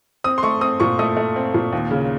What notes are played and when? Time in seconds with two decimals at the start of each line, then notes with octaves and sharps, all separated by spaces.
0.24 C4 D#6
0.38 C6
0.43 A3 C#6
0.61 C4 D#6
0.80 A#2 C#6
0.99 A3 D#6
1.17 A3
1.36 C4
1.54 A#2
1.72 D#2
1.91 C#3